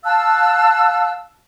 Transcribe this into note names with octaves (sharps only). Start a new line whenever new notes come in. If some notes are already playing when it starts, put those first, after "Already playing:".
F5 A5 E6 F#6